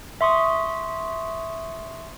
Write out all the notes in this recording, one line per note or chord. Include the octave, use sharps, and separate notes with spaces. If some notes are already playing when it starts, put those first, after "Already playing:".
E5 C6 C#6 D#6